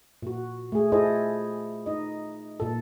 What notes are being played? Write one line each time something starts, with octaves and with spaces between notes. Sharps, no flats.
A#2 F#4
A3 G#4
E4 F4 G#4 A4 C5 D#5
D#4 D#5
A#2 A4